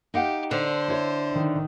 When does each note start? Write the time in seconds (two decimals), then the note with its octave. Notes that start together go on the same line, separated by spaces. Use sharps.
0.14 D#4 G4 F5 F#5
0.51 D3 C5
0.88 E4 C#5
1.33 D#3